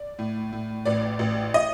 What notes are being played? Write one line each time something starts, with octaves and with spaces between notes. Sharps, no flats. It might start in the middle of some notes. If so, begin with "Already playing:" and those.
Already playing: D5
A2
A2
A1 D5
A1
D#5